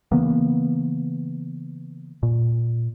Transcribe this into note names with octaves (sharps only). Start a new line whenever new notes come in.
C#3 E3 A#3 B3
A#2